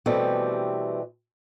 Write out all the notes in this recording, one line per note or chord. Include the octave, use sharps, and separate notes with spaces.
B2 E3 G3 A3 C4 G4